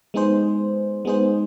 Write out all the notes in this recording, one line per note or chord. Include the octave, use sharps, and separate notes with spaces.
G#3 B3 D#4 G#4 C5
G#3 B3 D#4 G#4 C5